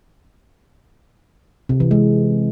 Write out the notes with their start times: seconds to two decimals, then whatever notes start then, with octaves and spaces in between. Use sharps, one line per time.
1.69 C3
1.80 E3
1.91 G#3